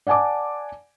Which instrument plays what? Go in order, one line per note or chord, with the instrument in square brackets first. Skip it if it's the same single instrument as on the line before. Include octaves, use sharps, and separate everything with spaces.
[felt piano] D5 F#5 G#5 A5 D6